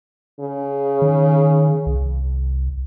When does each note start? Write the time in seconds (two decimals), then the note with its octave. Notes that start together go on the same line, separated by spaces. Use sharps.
0.40 C#3
1.02 D#3
1.86 C2